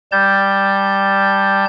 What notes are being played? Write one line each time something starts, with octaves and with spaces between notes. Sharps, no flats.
G3 A5 G6